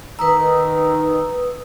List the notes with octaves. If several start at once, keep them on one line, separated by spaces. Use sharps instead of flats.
D#3 B4 A#5 D#6 E6